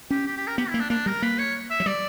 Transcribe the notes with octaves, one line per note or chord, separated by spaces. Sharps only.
C#4 G4
G4
G4
A#4
B3 G4
E4
A#3
D4
A#3 D4
G3 A#4
A#3 B4
C#5
E5
F#3
G3 D5